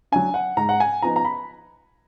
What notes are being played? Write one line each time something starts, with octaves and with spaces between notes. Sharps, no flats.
F#3 D4 G#5
F#5
G#2 A#5
F#5
G#5
F3 B3 D#4 A#5
A#5
B5